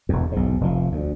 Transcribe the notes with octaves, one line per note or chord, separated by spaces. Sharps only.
E1 E2
B1 G#2
F1 G#2 F3
D2